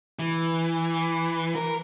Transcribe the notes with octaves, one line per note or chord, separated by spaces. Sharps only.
E3
A#4